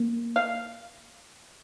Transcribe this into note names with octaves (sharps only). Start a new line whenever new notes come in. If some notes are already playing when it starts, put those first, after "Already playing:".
Already playing: A#3
F5